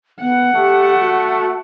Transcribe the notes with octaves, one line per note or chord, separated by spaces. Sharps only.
B3 F#5
A3 G4
F#4